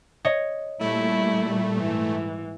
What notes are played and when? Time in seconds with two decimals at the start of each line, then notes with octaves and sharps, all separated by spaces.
0.25 C#5 D#5
0.81 A#2 G3 A3 E4
1.76 G#2 E3